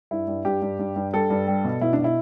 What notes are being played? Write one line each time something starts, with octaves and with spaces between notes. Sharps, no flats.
G2 E4
G2
G2 G4
G2
G2
G2
G3 A4
G2
G3
B2
B2 E4
D4
B2
E4